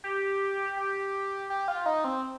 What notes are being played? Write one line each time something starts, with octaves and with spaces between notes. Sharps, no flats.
G4
G4
G4
F4
D#4
C4